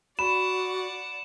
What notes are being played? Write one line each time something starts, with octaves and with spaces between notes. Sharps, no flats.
F#4 D5 F#5 B5 E7